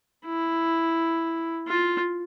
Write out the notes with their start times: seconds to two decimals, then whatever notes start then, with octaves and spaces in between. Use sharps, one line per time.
0.26 E4
1.68 F4